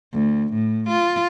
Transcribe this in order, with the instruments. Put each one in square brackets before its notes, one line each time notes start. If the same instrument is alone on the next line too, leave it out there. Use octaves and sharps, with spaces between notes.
[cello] D2
A2
F4